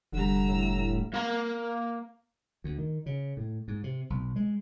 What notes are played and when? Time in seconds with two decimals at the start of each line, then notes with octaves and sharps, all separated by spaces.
0.12 F1 D3 G3 A#5 E6
0.48 A2
1.14 A#3 A#5
2.64 D2
2.78 D#3
3.06 C#3
3.37 A2
3.68 G#2
3.84 C3
4.10 B1
4.36 G#3